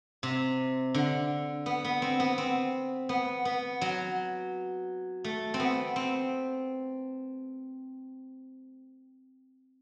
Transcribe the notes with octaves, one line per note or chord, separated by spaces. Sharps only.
C3
D3
B3
B3
C4
B3
C4
B3
B3
F#3
A3
C4
B3
C4